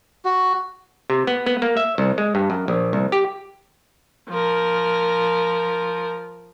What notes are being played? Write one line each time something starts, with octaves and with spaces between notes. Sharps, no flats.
F#4
C3
B3
B3
A#3
E5
C2
G#3
G2
F#2
A#1
C2
G4
F3 A#4